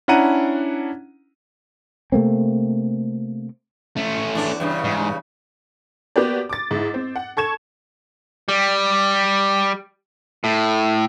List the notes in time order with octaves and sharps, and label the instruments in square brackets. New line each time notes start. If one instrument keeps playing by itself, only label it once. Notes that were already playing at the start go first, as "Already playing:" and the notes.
[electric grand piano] C#4 D4 E4 F#5 A#5 D#7
[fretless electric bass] C3 A3 A#3 C4
[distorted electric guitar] A3 C#4
[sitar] E2 D4
E2 G2 C#3
[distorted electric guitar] G#2
[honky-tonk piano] A#3 B3 F#4 G4 B4 D5
D6 A6
G#2 E4
C4
F#5
A4 C#6 G#6 E7
[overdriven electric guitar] G3
A2